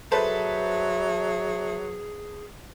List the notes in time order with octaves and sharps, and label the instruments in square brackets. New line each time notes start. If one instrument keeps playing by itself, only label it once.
[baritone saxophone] F#3 [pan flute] G#4 [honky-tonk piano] A4 B4 C5 [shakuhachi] E5